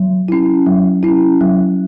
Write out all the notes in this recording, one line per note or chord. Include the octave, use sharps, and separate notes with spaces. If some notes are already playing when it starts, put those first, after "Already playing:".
Already playing: F#3
C#4 E4
F#3
C#4 E4
F#3